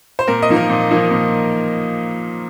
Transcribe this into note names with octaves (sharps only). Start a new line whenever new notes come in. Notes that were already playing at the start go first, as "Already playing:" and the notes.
C5
A#2 A#4
D#5
F3 A#3 D#4
A#4
A#2
F3 A#3 D#4
A#2